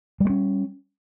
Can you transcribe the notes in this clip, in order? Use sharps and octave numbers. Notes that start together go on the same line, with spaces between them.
G3 A3 C#4